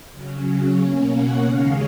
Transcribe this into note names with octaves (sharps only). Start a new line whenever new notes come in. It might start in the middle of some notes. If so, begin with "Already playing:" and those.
C#3 F#3 C#4
B2 A#3 C#4
F#5
D#2 C#3 G#3 C#4 F5